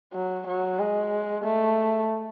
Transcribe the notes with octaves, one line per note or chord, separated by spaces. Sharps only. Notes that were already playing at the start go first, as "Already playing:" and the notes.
F#3
F#3
G#3
A3